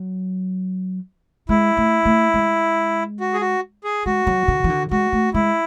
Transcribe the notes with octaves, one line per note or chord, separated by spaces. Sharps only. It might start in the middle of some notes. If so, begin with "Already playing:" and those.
Already playing: F#3
G#3 E4
A3
A3
G#3
F#4
G#4
F#4
G#4
G#3 F#4
F#3
D3
E3
D3
G#3 F#4
A3
G#3 E4